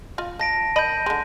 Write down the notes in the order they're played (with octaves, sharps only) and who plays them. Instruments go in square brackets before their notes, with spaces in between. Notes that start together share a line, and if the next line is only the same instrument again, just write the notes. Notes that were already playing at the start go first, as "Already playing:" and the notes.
[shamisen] F4 D#5 F5
[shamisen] D#5 [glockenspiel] A5 A#6 D7
[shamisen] D#3 D#5 B5 [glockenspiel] G6 D#7
[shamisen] D3 G#3